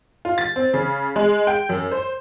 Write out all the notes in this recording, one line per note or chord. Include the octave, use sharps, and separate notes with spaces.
F4
A6
C4
C#3
G#3
G5
F#2
C5